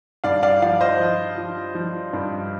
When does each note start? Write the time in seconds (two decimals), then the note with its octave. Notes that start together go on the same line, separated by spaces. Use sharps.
0.24 G2 D5 F5
0.43 D5 F5
0.62 F3 D5 F5
0.81 C5 D#5
1.00 F3
1.38 F3
1.75 F3
2.13 G2